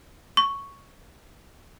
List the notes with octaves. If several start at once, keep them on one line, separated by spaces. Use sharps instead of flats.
C#6